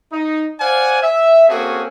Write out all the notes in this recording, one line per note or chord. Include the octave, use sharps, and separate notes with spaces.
D#4
C5 D5 F5 F#5 G#5
E5
A#3 C4 C#4 F#4 G#4 A4